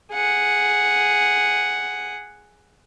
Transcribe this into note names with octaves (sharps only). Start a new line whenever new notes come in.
G#4 F#5